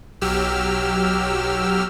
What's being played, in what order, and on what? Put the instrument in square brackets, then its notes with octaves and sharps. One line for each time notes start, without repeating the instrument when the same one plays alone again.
[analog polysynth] B1 F#3 G4 E6 F6